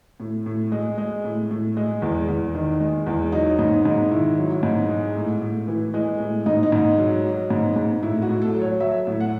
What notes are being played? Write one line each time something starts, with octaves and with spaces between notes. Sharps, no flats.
A2
A2
G#3
G#3
A2
A2
G#3
E2
E2
D#3
G#3
E2
F#3 D#4
G#2 D#4
G#2 D#4
D#3 E4
F#3
G#2
G#3
A2
A2
E3
G#3
A2
G#2 D#4
D#4
G#2
F#3
F#3
G#2
G#2
A2 E4
F#4
A2
A4
F#3
C#5
F#3 E5
A2
F#5